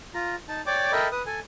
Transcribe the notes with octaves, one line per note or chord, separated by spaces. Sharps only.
F4 A#5
D#4 A5
C#5 D5 G5 D6
A4 A#4 D#5 E5 G5 B5
B4 D#6
A4 G#5